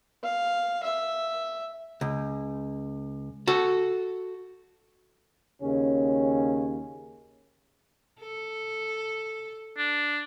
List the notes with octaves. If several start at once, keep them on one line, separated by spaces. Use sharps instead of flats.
F5
E5
C#2
F#4 A4
D#2 C#3 C#4
A4
D4